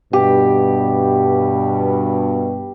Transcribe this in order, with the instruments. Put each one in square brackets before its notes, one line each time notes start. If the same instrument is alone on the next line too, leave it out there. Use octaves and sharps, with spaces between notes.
[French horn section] G2 B2 [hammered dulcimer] G4